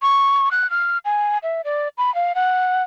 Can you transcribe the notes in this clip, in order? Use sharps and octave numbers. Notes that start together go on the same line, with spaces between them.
C#6
F#6
F6
G#5
E5
D5
B5
F5
F#5